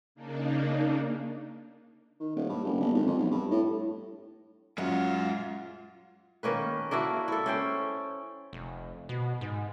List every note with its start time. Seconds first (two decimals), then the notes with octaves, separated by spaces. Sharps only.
0.15 C#3 A#3 D4 D#4
2.20 D#3
2.36 D#1
2.49 G2
2.64 F#1
2.80 G1
2.95 G#1
3.06 F2
3.18 B1
3.31 G2
3.51 A2
4.78 F#2 G#3 F4 F#5
6.43 D#3 A#3 C#4 B4
6.91 A#3 D4 E4 F#4
7.28 E4 A4
7.46 C#4 C5 G5
8.53 F1
9.09 B2
9.41 G#2